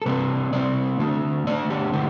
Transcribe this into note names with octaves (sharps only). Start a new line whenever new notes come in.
A4
C3 G3 C4 B4
C3 G3 C4 D5
D3 A3 D4
D3 A3 D4 D5
G4
D3 A3 G4